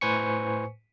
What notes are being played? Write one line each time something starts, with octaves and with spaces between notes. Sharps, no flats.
A2 B4 C5 G#5 C#6 C#7